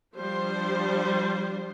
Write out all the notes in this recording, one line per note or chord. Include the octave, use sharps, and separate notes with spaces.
F3 G3 D4 C5